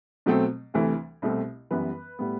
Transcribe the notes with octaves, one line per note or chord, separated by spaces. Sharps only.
B2 F#3 A3 C4
D2 C3 E3 A3
C2 B2 A3 C4
F#2 E3 G3 B3 B4
A2 G3 B3